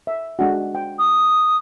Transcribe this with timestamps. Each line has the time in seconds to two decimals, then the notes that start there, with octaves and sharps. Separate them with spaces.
0.07 E5
0.39 G#3 D4 F#4
0.75 G5
0.99 D#6